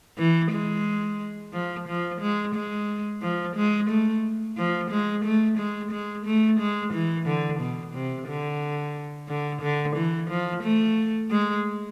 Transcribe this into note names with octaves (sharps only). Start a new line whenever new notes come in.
E3
G#3
F3
F3
G#3
G#3
F3
G#3
A3
F3
G#3
A3
G#3
G#3
A3
G#3
E3
D3
B2
C3
D3
D3
D3
E3
F3
A3
G#3